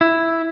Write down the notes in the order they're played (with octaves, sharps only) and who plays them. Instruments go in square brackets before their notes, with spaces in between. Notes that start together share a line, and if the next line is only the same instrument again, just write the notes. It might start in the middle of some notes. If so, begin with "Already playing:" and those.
[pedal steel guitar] E4